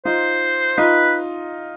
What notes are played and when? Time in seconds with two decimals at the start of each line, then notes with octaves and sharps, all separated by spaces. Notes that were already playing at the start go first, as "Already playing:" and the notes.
0.05 D#4 F4 C5
0.78 D#4 F4 B4